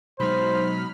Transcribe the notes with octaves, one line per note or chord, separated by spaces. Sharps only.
B2 F#3 G#3 D#4 C5 B5 F6